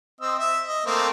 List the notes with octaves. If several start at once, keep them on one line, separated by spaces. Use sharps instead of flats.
C4 D#5 E6
E5
D#5
A3 A#3 C4